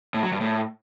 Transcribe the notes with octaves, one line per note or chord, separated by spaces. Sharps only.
A2
F#3
G2
A2